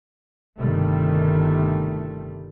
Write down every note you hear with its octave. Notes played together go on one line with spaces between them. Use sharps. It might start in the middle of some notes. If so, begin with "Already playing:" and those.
G1 C3 D#3 G3 A3